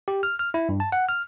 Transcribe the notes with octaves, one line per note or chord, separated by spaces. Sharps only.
G4
F6
F6
E4
G2
A5
F#5
F6